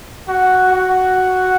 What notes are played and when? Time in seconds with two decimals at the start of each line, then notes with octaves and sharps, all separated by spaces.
0.29 F#4
0.73 F#4